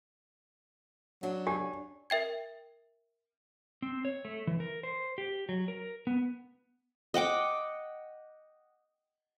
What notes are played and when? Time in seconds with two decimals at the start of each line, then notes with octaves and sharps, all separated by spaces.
1.23 F#3 D4
1.47 G4 G#5
2.10 A#4 E5 G5 G#6
3.82 C4
4.05 C#5
4.25 A3
4.47 E3
4.60 A#4
4.83 C5
5.18 G4
5.49 F#3
5.68 A#4
6.07 B3
7.14 D#5 F#5 G5 D6